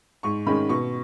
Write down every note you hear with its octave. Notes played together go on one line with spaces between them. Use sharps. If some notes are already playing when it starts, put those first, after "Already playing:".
G#2 C#6
D#3 G#3 C#4 B5
B2 C#6